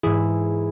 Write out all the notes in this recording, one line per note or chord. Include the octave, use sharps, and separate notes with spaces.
G#2 E3 E4 G#4